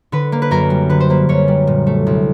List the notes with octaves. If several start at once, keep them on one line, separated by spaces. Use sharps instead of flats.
D3 B4
A#3
B4
F#2 A#4
G3
D3 B4
C5
A#3 B4
F#2 C#5
G3
A#2
A3
C2